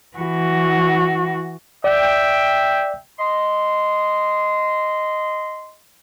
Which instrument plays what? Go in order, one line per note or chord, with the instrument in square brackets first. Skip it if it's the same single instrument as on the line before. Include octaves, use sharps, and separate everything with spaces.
[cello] E3 F#4
[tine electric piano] D5 [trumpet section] E5 G5
[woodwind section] D#5 C6